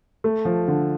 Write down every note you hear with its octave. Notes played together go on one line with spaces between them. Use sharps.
A3
F3
D3